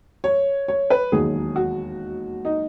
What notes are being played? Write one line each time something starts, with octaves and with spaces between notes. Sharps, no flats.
C#5
C#5
B4
E1 D#2 D#3 F#3 G#4
F#4
D#4